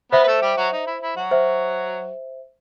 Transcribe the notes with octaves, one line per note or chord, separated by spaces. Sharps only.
B3 B4 C5 E5
B4
A3 A4
G3 G4
F#3 F#4
D#4
E4
E4
F#3 F#4
C5 E5